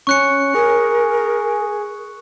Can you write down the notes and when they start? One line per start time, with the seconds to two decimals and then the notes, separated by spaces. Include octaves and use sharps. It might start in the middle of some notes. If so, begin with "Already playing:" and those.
0.07 C#4 C#6 F#6 C#7
0.55 G#4 A#4